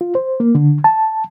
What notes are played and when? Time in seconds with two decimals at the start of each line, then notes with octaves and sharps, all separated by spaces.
0.01 F4
0.15 C5
0.40 A#3
0.55 D3
0.84 A5